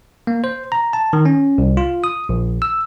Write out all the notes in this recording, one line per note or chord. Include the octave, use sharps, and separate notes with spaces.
A#3
C5
A#5
A5
D#3
C#4
C2
F4
D#6
A#1
E6